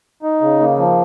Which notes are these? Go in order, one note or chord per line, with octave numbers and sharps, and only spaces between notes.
D#4
C#3
A#3
F3